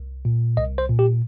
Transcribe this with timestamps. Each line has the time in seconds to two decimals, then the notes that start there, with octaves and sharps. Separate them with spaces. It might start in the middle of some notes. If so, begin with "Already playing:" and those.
Already playing: C2
0.25 A#2
0.57 C2 D#5
0.78 C5
0.89 A#2
0.99 G4